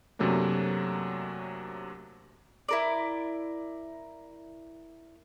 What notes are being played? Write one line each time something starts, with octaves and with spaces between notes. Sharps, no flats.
F#2 C3 F#3 A3 A#3 D4
E4 A#4 D5